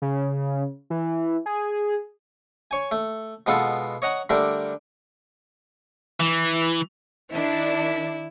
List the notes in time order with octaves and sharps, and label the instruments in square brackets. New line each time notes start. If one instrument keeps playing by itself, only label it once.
[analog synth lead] C#3
E3
G#4
[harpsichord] C#5 G#5
A3
B2 G#3 B3 F4 A4
C#5 D#5 F#5 A#5
D3 G3 A3 D4 A#4
[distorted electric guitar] E3
[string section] D#3 D4 [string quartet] E4